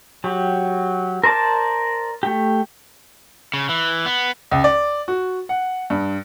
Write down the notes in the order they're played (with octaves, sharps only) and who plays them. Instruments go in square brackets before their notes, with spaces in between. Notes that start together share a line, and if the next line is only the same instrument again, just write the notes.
[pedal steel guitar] F#3 G4
A#4 C5 D5 A5 D6
A3 G4
[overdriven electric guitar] C#3
E3
B3
[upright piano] C#2
D5
F#4
F#5
G2